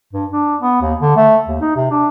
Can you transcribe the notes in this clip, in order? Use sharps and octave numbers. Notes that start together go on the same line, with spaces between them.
G2
D4
B3
D#2
D3
A3
D#2
D#4
C3
D4